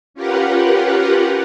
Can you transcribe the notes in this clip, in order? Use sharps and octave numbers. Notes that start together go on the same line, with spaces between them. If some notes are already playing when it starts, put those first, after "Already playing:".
C#4 F4 G4 A#4 B4 F#5